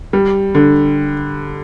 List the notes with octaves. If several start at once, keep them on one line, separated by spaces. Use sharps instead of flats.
G3
D3